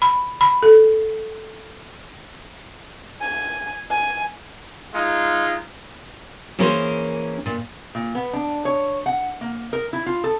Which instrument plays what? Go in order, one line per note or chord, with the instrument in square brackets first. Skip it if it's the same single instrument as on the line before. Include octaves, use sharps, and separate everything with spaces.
[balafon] B5
B5
A4
[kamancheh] G#5
G#5
[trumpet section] G#3 D#4 F4
[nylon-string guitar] E3 A#3 C#4 G#4 A#4 C5
A#2
[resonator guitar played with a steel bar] A#2
B3
D4
C#5
F#5
A#3
A#4
E4
F4
A4